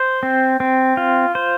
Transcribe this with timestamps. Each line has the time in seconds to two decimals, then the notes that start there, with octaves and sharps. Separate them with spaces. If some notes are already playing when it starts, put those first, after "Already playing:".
Already playing: C5
0.23 C4
0.60 C4
0.97 F4
1.35 C5